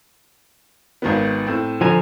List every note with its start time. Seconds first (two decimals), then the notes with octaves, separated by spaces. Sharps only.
1.02 G#1 D#3 B3
1.47 A2 C4
1.81 D3 F3 G#5 A#5